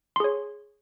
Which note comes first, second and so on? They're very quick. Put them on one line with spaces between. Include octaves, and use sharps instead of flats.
C6 G#4 C#5